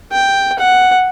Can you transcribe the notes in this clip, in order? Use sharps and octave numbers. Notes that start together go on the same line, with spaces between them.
G5
F#5